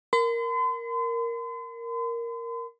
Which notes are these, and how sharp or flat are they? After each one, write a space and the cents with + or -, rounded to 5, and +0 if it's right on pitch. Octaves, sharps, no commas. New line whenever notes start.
A#4 +0 C6 -45